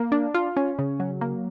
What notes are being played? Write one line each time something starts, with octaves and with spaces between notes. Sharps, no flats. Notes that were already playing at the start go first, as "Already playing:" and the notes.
Already playing: A#3
D4
F4
C#4
C#3
F#3
A#3